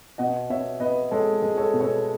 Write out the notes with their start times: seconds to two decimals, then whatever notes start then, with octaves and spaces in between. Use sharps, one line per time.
0.18 B2 D#5 F#5
0.50 B2 C#5 E5
0.80 B3 B4 D#5
1.11 G#3 A4 C#5
1.42 G#3
1.57 A4 C#5
1.74 B2
1.81 A4 C#5